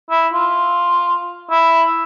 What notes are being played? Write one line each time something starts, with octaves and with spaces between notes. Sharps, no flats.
E4
F4
E4